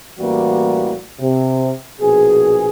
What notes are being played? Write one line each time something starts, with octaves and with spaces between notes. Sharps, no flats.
A1 E3 G3 A#3 F#4
C3
A#1 B2 G#4